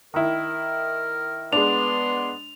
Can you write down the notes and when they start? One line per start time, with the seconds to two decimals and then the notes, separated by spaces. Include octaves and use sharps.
0.14 D#3 E4 A#4
1.53 G#3 B3 D4 C6 F7